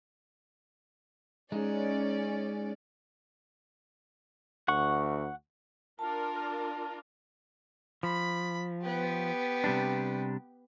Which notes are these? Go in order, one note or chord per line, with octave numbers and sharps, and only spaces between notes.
G#3 C#4 D#4 D5
D2 F#5 C#6
D4 F4 A#4 A5
F3 B5
B3 G4
C3 G3 D4